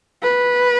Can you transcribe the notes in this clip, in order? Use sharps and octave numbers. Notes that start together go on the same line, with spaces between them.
B4